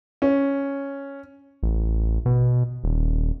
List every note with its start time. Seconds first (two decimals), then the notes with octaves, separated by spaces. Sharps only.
0.22 C#4
1.63 A1
2.26 B2
2.84 D#1